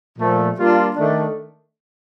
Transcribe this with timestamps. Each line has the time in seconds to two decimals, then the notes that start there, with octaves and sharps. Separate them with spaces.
0.17 A#2 F3 A3
0.56 G3 A#3 D4 F4
0.95 D#3 A3 D4